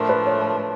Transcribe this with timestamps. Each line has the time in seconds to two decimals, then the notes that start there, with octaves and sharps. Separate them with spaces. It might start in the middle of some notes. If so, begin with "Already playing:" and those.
Already playing: A2 F3 A3 D4 A#4
0.09 B4
0.26 C#5